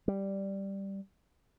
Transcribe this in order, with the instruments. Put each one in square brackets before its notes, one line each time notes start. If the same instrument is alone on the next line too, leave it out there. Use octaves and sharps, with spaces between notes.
[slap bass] G3